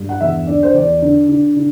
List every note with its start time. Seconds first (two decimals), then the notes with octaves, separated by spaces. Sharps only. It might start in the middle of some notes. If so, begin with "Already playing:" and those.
Already playing: G2
0.09 F#5
0.21 E2 E5
0.47 D3 D5
0.63 C5
0.74 E2 D5
1.02 D3
1.29 D3
1.56 D3